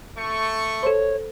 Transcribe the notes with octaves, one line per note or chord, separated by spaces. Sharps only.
A3 C#6
A4 C5 C#5